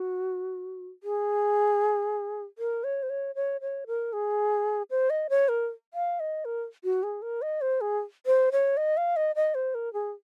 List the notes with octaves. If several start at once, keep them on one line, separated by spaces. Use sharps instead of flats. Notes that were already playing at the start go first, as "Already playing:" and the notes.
Already playing: F#4
G#4
A#4
C#5
C5
C#5
C#5
C#5
A#4
G#4
C5
D#5
C#5
A#4
F5
D#5
A#4
F#4
G#4
A#4
D#5
C5
G#4
C5
C#5
D#5
F5
D#5
D#5
C5
A#4
G#4